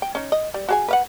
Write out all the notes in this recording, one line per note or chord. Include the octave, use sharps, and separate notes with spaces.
G5
C#4 D#4
D#5
G3
F#4 G#4 G#5
B4 F5 F#5